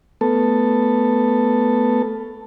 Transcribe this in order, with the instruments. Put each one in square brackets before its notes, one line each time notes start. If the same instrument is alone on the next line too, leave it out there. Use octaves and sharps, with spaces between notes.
[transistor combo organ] A3 B3 A4